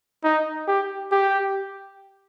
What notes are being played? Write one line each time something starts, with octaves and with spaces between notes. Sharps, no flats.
D#4
G4
G4